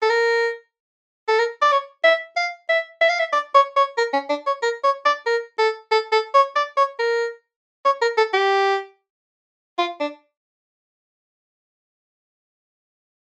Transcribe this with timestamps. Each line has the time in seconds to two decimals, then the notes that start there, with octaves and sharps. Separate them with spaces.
0.02 A4
0.10 A#4
1.28 A4
1.39 A#4
1.62 D5
1.72 C#5
2.04 E5
2.36 F5
2.69 E5
3.01 E5
3.09 F5
3.19 E5
3.33 D5
3.54 C#5
3.76 C#5
3.98 A#4
4.13 C#4
4.29 D4
4.47 C#5
4.62 A#4
4.84 C#5
5.05 D5
5.26 A#4
5.59 A4
5.92 A4
6.12 A4
6.34 C#5
6.56 D5
6.77 C#5
6.99 A#4
7.85 C#5
8.02 A#4
8.17 A4
8.33 G4
9.78 F4
10.00 D4